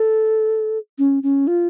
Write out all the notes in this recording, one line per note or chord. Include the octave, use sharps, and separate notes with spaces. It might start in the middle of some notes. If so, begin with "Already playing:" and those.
Already playing: A4
C#4
C#4
F4